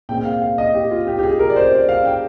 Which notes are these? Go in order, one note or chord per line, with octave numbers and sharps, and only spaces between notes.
A#2 G#3 C4 G5
F5
F5
D#5
G4
F4
G4
G4
G#4
A#4
D5
C5
D5
F5
G5